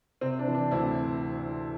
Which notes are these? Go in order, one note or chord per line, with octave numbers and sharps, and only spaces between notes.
C3 C4
D4
E3
D4
D2 C4 E4